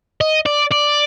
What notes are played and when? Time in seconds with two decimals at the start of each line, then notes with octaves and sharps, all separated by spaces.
0.21 D#5
0.46 D5
0.71 D5